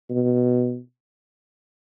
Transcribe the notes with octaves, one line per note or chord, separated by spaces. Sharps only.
B2